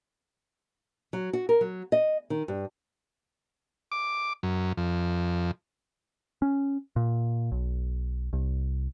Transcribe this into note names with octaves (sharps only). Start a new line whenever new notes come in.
F#3
F#4
A#4
F#3
D#5
D#3
G2
D6
F#2
F2
C#4
A#2
B1
C2